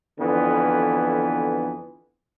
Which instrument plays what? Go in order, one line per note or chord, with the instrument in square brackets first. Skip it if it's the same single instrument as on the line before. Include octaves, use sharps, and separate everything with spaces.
[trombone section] F2 D3 E3 B3